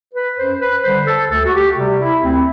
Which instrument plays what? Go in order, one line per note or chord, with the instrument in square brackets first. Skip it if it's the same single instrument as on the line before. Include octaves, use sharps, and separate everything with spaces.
[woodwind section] B4
F#2 C5
B4
D3 G3 C5
A4
D2 A4
F#4
G4
C3 G3
E4
D2 C4